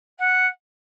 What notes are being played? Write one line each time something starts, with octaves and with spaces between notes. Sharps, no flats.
F#5